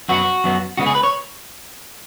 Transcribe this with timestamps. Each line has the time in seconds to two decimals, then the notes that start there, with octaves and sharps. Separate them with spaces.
0.09 F#2 F#3 B3 F#4
0.44 F#2 F#3 B3
0.77 C#3 G#3 B3 F#4
0.86 G#4
0.95 B4
1.03 C#5